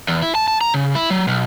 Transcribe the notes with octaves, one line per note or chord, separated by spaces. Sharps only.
E2
E4
A5
A5
A#5
C#3
E4
F#3
B1